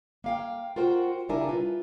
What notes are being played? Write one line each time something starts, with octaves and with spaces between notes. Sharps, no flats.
A#3 F5 G5
F4 F#4 A#4 C5 F#5 G5
C#3 G3 D4 E4 A#4 G#5
F4 B4